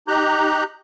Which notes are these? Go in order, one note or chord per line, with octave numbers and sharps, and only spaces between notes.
D#4 G4 A#5 F#6 G6